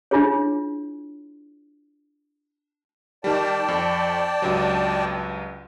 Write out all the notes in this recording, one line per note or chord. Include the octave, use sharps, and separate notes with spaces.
D4 E4 F4 G#4 C#5
D#3 G3 D5 G5 A5
F2
C#2 G2 F#3